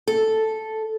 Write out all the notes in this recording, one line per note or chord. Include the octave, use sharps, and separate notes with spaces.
A4